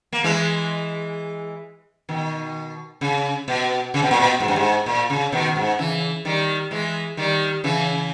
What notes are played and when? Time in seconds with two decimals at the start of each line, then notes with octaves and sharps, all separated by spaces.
0.13 A#3
0.24 E3 G#3
2.09 B2 D#3
3.01 C#3
3.48 B2
3.94 C#3
4.02 B2
4.11 A#2
4.20 B2
4.40 G#2
4.48 G2
4.56 G#2
4.86 A#2
5.10 C#3
5.32 B2 D#3
5.56 G#2
5.79 C#3 E3
6.25 D#3 G3
6.71 E3 G#3
7.17 D#3 G3
7.64 C#3 E3